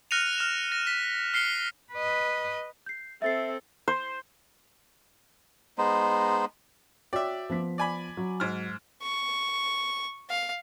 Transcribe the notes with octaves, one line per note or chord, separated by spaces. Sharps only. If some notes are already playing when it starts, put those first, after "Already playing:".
F6 F#6 A#6 C#7 D#7 F7
F6 E7
A#6
B6
F6 C7 C#7 G7
B4 D#5
G6 C7
C4 A4 E5 A6 C7
C5
G#3 B3 D#4 C5
F#4 C#5 D5 E5 G5
F3 B3 B6
D5 G#5 B5
F#3
G#2 F6
C#6
F5